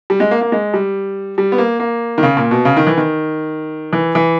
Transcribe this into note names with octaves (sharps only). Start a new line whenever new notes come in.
G3
G#3
A#3
A#3
G#3
G3
G3
B3
A#3
A#3
D#3
C#3
A#2
B2
C#3
D#3
E3
D#3
E3
E3